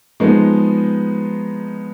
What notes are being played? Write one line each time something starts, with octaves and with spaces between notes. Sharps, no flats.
F3 G#3 B3 D#4